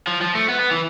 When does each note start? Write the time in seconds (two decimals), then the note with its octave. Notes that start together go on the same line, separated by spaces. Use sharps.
0.07 F3
0.21 F3
0.35 A3
0.48 B3
0.60 B3
0.71 E3